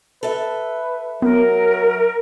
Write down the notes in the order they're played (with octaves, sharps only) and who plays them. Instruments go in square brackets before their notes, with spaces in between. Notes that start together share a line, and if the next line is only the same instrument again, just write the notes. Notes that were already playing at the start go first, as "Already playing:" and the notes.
[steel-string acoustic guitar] A4 E5 [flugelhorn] B4
[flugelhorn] F#3 [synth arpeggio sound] B3 [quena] A#4